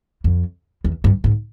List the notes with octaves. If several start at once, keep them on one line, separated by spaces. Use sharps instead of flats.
F2
E2
G2
G#2